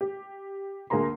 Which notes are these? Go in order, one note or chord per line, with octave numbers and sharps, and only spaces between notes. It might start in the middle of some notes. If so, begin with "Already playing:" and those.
G4
D2 A#3 G#4 A#5 C6